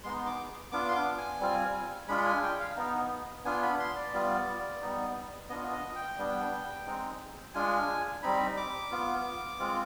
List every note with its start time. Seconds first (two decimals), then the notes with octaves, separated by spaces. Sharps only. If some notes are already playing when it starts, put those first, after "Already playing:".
0.04 G#3 B3 D#4 C6
0.26 D6
0.72 B3 D4 F4 D6
0.88 C6
0.95 D6
1.18 G#5
1.40 G3 C4 F4
2.08 G#3 D4 F4 B5
2.26 G#5
2.43 G5
2.60 F5
2.76 B3 D#4
3.45 B3 D4 F4 G#5
3.62 B5
3.79 C6
3.96 D5
4.13 G3 B3 F4
4.82 G3 B3 D#4
5.49 B3 D4 F4 D#5
5.72 D#5
5.96 G5
6.18 G3 B3 D4
6.86 G#3 C4 D#4
7.54 G#3 D4 F4 G#5
8.23 G3 C4 D#4 B5
8.57 D6
8.91 B3 F4
9.60 G#3 C4 F4